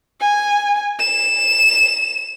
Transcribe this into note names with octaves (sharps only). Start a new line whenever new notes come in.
G#5
E7